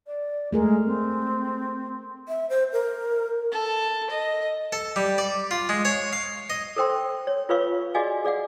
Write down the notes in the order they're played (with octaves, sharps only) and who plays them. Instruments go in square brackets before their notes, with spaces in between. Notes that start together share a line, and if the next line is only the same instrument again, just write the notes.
[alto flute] D5
[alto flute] G#3 [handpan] A3 G#4 A#4
[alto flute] C4
[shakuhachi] E5
C5
A#4
[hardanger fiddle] A4
D#5
[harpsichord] A4
G3
D5
F4
G#3
C#5
F5
D#5
[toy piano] A4 A#4 C5 G5 C6
C#5
F4 A#4 B4 C#5 F5 C#6
F#4 G#4 D5 D#5 F5 G#5
G#4 D5 F5 F#5